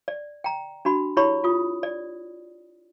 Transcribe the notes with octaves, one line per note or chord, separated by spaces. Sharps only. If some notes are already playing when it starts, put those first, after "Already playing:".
D5
G5 A#5
D4 F#4 B5
E4 G4 C#5 B5 C#6
F4 D#6
D5